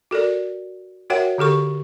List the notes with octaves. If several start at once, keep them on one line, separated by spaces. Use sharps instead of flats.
F#4 A4 A#4 D5
F#4 A#4 C#5 E5 F#5 G5
D3 G4 A4 C#6